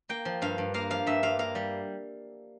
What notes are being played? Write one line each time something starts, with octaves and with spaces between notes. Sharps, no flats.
A#3 G5
F3
G2 F5
G2
A#3 F5
F3 F5
G2 E5
G2 F5
A#3 F5
G3